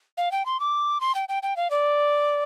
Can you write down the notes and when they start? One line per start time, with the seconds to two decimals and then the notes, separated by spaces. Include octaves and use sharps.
0.17 F5
0.32 G5
0.46 C6
0.60 D6
1.01 C6
1.15 G5
1.29 G5
1.43 G5
1.56 F5
1.71 D5